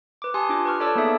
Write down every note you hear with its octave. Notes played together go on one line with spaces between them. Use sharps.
B4 D6
G4 G#5 A5 C6 D#6
D4 F4 D6
B4 C#6 F6
A4 C#5 D5 A5 D6 E6
A#3 B3 D#4 G#4 A4 E5